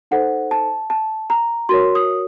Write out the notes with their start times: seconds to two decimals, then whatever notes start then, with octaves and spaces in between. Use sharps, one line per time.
0.11 D#4 A4 C5 F#5
0.51 A5
0.90 A5
1.30 A#5
1.69 F#4 A#4 C#5 C6
1.95 D#6